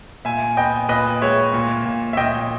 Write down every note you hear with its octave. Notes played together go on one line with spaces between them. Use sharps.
A#2 E5 G#5
B3 D#5 G5
A#2 B4 D#5
G#3 C#5 E5
A#2
A#2
E5
A#2 D#5 G5